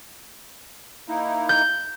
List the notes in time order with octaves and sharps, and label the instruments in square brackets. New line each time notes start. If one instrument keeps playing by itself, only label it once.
[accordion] A#3 D#4 E4
[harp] G6